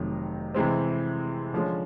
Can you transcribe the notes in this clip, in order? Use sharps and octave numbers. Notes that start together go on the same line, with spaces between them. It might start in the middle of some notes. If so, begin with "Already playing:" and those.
Already playing: F1 F2 C3 D#3 F#3
C3 E3 G#3 C4
D3 F3 G#3 C#4